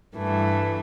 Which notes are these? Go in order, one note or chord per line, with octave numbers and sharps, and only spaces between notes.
G2 E3 A3